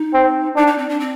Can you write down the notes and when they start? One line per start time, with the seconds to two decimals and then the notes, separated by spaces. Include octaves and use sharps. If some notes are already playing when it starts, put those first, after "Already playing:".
Already playing: D#4
0.14 C4
0.56 D4 D#4
0.67 D#4
0.78 C4
0.89 D4
1.00 C4